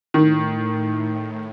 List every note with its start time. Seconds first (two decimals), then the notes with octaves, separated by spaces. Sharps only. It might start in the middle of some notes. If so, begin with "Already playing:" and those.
0.14 A2 D#3